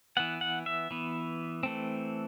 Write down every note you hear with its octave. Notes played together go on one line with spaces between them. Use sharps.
E3 B3 F#5
F#5
E5
E3 B3
E3 A3 C4